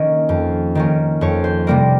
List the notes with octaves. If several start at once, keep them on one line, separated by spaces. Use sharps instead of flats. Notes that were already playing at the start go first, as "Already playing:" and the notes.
Already playing: D#3 A#3 C#4 D#5
F2
D#3 A#3 C#4
F2 C#5
C5
C3 G3 A#3 A#4